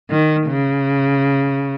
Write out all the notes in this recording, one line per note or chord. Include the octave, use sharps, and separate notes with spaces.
D#3
C#3